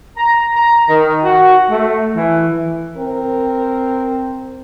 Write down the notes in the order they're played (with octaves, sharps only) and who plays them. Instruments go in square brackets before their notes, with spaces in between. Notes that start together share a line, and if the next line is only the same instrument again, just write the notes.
[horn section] A#5
A#5
D#3
F#4
A3
E3
[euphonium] C4 [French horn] A#4